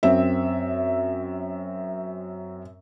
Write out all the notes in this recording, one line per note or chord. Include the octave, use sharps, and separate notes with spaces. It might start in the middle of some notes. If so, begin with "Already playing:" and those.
F#2 C4 E5